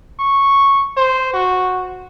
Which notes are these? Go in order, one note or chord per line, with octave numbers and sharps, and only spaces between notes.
C#6
C5
F#4